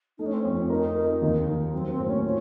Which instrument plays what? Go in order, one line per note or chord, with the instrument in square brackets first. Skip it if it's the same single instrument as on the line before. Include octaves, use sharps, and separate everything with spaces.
[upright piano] A3 [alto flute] D#4
[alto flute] C#4
C4
[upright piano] F2 [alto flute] C#4
[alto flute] D#4 [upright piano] A#4
[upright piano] A#4
D#2
D#2
[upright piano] F#3 [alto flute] C4
[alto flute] C4
[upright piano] A2
[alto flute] C#4
[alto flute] C#4 [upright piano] F4